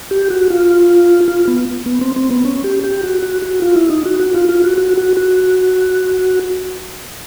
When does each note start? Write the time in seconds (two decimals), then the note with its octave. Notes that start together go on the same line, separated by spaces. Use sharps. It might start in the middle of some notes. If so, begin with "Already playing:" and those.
0.11 G4
0.30 F#4
0.50 F4
1.28 F4
1.48 B3
1.86 B3
2.01 C4
2.16 C4
2.30 B3
2.45 C#4
2.64 G4
2.84 G4
3.03 F#4
3.22 F#4
3.42 F#4
3.62 F4
3.76 E4
3.90 D#4
4.05 F#4
4.20 F#4
4.34 F4
4.49 F4
4.64 F#4
4.78 F#4
4.97 F#4
5.17 F#4